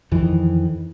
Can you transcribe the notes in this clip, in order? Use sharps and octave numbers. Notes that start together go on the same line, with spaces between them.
F2 D#3 E3